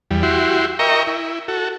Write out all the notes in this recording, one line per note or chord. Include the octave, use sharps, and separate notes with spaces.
E2 G3
E4 F#4 G4 C6
A#4 D#5 E5 G5 A#5 C#6
E4
F#4 A4